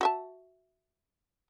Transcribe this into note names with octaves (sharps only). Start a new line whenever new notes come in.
F#4 E5 A5